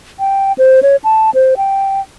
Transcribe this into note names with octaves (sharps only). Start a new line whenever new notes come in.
G5
C5
C#5
A5
C5
G5